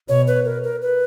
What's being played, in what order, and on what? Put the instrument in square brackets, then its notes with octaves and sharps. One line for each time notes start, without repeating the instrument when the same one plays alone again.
[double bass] B2 [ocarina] C#5
[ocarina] B4
A#4
A#4
B4